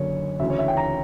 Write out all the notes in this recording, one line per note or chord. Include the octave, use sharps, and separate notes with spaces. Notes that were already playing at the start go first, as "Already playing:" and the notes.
Already playing: F#1 F#2 D3 C#5
D2 C#3 E3 E5
C#5
E5
G5
A#5